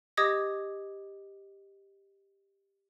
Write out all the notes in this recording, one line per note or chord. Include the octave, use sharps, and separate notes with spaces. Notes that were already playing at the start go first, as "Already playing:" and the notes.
G4 D#5 D6 D#6 G#6 A#6